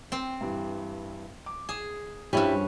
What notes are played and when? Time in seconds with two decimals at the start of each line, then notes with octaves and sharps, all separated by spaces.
0.12 C4 G5
0.41 G2 E3 G3
1.46 D6
1.69 G#4 E7
2.33 G2 F3 G3 C4 C#4 E4